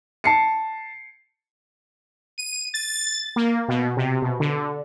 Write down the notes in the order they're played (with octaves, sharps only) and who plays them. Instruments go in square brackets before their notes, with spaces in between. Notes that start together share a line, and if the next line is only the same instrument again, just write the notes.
[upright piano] A5 C7 C#7
[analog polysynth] D#7
A6
A#3
B2
C3
B2
D3